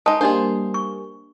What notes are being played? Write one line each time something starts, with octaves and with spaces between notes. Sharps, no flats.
G#3 D#4 A5 D#6
G3 A#3 D4 G#4 C5 D#5
C#6